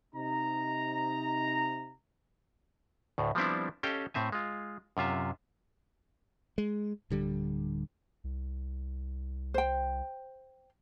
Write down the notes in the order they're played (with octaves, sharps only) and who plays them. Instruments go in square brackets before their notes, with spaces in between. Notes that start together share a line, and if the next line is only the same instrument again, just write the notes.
[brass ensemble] C3 D#4 A#5
[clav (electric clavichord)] D2 A2
F3 G3 B3 C4 D4 E4
C#4 G4 A4 D#5 F5 G5
A2 C4 E5 G#5
G#3 F4
F#2 C3 F4 E5
[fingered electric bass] G#3
D1 D3 G3
[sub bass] C2
[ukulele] C5 G5